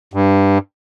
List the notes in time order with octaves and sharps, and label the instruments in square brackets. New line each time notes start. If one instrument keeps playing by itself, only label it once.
[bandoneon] G2